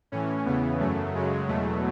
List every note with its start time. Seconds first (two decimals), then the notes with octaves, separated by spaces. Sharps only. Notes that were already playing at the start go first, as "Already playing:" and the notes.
0.12 A2 E3 C#4
0.46 E2 C#3 E3 B3
0.80 F#2 C#3 F#3 A3
1.15 F#2 C#3 F#3 G#3
1.48 E2 B2 F#3 A3